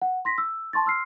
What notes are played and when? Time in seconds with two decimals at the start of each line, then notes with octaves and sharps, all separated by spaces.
0.02 F#5
0.25 C6 A#6 B6
0.38 E6
0.73 A5 C6 C#6 A6
0.86 C6 E6 F6 C7